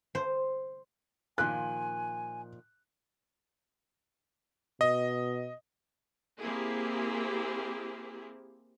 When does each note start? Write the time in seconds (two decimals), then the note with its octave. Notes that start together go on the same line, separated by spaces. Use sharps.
0.15 C5
1.38 A#2 D#3 F3 G#5 F#6
4.81 B2 D#5
6.42 A#3 C4 E4 G4 G#4